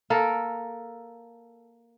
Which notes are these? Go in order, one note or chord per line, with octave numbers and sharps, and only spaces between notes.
A#3 A4 A#4